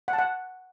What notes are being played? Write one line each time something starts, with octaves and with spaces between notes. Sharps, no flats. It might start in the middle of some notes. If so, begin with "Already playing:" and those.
F#5
A5
F#5